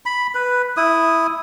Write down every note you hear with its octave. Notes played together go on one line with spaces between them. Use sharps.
B5
B4
E4 D#6